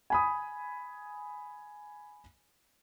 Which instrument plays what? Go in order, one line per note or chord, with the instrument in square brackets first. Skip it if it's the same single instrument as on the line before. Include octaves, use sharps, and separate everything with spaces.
[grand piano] G#5 B5 D#6